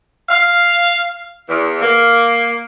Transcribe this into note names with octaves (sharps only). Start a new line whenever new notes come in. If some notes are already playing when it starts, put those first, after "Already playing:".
F5
E2
A#3